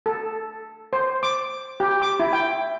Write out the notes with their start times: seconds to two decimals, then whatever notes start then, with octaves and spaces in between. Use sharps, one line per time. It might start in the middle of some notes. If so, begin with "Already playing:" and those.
0.06 A4
0.93 C5
1.23 D6
1.80 G4
2.02 D6
2.20 E4
2.33 G5